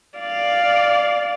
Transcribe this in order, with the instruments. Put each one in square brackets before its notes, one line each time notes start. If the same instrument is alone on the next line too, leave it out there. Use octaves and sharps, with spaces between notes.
[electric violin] D5 F5